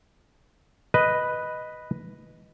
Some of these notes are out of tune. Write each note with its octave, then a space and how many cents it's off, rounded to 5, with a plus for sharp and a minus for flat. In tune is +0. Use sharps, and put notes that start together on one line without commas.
B4 +0 D#5 +0